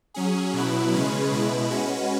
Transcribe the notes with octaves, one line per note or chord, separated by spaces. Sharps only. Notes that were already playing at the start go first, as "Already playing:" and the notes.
F#3 C#4 G#4
B2 F#3 E4 B4
C#3 G#3 C#4 G#4 B4
B2 G#3 E4 B4
G#3 C#4 F#4 B4